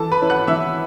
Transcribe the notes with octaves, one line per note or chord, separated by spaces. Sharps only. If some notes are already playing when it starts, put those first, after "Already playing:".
Already playing: E3 A4 A5
B4 B5
C#4 E4
F#5 F#6
E3 E5 E6